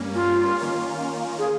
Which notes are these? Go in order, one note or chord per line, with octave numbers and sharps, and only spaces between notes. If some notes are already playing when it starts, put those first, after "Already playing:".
Already playing: G2 G3 A#3 C#4
F4
D#3 A#3 C#4 F4
G#4